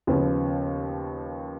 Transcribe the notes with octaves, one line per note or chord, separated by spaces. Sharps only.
D#2 C#3 F3 B3